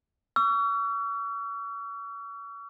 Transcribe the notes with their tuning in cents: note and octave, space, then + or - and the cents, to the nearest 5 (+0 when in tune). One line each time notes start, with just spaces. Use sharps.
C#6 +40 E6 +45